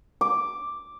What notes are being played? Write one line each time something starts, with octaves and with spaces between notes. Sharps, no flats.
D6